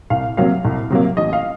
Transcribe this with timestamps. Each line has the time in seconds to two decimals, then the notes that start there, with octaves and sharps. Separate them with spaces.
0.10 C2 F5
0.37 C3 F#3 A#3 F5
0.65 C2
0.90 C3 F#3 A#3
1.17 A1 D#5
1.33 F5